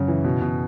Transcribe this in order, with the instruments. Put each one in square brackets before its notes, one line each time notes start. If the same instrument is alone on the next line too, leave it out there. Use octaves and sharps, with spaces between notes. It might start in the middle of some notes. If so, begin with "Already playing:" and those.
Already playing: [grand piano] F#2 C#3 F#3
E3
B2
B2